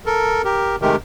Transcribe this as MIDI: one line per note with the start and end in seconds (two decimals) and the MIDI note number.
0.06 0.42 69
0.06 0.42 70
0.44 0.76 67
0.44 0.76 70
0.82 0.96 48
0.82 0.96 51
0.82 0.96 56
0.82 0.96 57
0.82 0.96 67
0.82 0.96 70